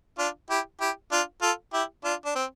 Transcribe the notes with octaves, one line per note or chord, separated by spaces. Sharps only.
D4 F4
E4 G4
E4 G4
D4 F4
F4 A4
E4 G4
D4 F4
D4
C4